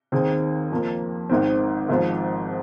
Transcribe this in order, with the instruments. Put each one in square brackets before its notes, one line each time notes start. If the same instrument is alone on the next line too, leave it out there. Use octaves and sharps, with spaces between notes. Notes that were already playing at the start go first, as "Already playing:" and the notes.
[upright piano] D#2 D#3 C4 G#4
F2 F3 A#3
G#1 G#2 D#3 C4
G#1 G#2 F3 C4 F4